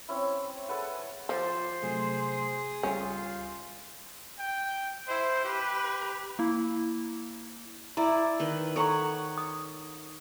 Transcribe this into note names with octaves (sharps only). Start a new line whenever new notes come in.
C4 C#4 E4
G#4 A4 B4 F#5
F3 F4 C5 D6 A6
C3 F#3 A3 G#4
C#2 G3 C#4 F4 G6
G5
E4 C5
G4 B4
A#3 E4
E4 D5 A#5
D#3 B4
A4 C#5 F#5 A#5 C#6
D#6